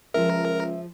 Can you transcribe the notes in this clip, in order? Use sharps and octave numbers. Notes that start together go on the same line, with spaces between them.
C#2 F3 G#4 A#4 E5